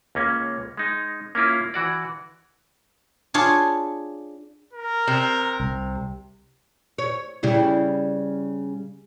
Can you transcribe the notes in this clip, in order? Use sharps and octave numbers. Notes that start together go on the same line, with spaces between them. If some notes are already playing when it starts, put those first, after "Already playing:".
C#2 A#3 C#4
G#3 D#4
A#3 C#4 E4 F4
E3 F#4 D5
D4 F4 G#4 C#5
A#4
C3
C2
C#5
C#3 G3 E4